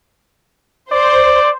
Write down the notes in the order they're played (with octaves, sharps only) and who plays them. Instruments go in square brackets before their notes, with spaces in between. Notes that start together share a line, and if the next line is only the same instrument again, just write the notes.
[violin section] C5 [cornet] D5